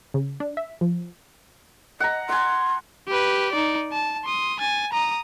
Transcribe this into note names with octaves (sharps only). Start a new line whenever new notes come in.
C#3
D4
E5
F3
D#5 F#5 A#5
F#5 G#5 C6
G4 B4
D#4 D5
A5
C6 D#6
G#5 A6
A#5 D#6